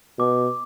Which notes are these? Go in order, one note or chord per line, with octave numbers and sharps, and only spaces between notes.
B2 D6